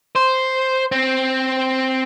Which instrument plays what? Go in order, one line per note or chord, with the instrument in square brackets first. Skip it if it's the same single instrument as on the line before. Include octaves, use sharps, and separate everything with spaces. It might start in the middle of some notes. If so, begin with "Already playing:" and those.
[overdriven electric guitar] C5
C4